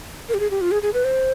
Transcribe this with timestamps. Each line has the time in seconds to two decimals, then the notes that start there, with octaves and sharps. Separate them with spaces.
0.29 A#4
0.34 G4
0.40 G#4
0.51 G4
0.61 F4
0.71 G#4
0.83 G#4
0.94 B4
1.05 C5